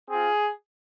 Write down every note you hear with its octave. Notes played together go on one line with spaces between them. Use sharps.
C4 F4 G#4